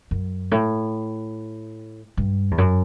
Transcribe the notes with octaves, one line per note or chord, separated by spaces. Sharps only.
F#2
A2
G2
E2
F#2